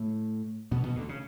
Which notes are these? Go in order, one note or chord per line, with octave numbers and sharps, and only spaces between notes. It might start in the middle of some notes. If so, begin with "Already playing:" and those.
Already playing: A2 A3
B2 B3
B2 B3
D2 D3
C#3